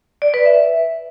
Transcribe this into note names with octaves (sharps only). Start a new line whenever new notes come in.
D5
B4
E5